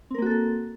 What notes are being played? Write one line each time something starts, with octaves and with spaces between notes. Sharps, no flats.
A#3 C4 F#4 A4 A#4